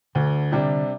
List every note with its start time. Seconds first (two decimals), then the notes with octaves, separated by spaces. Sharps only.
0.15 D2 D3
0.52 C3 G3 D4